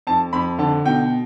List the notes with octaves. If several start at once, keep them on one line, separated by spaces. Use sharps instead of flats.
F2 A5
F2 B5
D3 A5
B2 G5